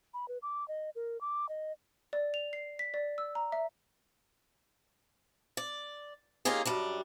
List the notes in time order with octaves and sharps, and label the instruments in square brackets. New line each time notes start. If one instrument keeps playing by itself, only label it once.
[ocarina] B5
B4
D6
D#5
A#4
D6
D#5
[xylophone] D5
F7
C7
B6
D5
E6
A#5
E5
[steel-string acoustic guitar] D5
A#3 C#4 D#4 F4 G4 G#4
F#2 G3 D4